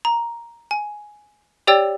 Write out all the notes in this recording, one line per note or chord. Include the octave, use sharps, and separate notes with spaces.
A#5
G#5
G4 C#5 D5 G5 E6 A6